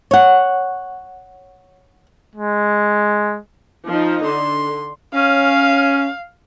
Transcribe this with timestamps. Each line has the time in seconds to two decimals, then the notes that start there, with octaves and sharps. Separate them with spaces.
0.11 C#5 F#5
2.35 G#3
3.87 F3 D#4
4.23 D3 C6
5.15 C#4 F5